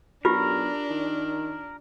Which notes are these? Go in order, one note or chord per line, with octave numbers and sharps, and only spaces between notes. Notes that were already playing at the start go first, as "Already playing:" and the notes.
B1 D4 F4 G4 A#4
D#3